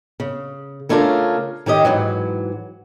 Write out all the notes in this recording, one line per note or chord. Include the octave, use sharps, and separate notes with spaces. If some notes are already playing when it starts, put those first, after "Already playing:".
C#3
C#3 A3 C#4 D4 F4 A#4
D#3 C#4 G4 D#5
G#2 E3 F#3